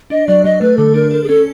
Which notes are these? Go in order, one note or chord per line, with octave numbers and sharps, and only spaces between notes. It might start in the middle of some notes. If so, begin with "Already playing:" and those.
D4 D#5
F#3 D5
F#3 D#5
A3 B4
D3 A4
D4 A#4
A4 A#4
G#4
C#4 A4